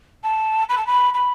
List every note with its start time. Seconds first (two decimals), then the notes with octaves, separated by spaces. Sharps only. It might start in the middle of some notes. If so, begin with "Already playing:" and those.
0.23 A5
0.69 B5
0.77 A5
0.86 B5
1.14 B5